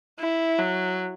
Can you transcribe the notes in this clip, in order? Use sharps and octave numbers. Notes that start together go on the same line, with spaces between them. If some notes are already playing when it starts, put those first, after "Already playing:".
E4
F#3